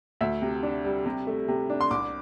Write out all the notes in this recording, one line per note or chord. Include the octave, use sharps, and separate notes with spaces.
D2 E5
C3
D4
G3
C3
A3
C3
D4
C6
C2 D6